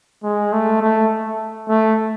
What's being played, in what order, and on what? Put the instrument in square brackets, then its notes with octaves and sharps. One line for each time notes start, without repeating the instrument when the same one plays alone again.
[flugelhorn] G#3
A3
A3
A3